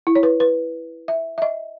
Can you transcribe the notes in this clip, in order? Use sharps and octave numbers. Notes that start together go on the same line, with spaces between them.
E4
C#5
B4
B4
E5
E5
D#5